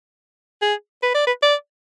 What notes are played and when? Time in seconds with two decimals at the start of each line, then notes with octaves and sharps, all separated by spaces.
0.62 G#4
1.03 B4
1.15 D5
1.27 B4
1.43 D5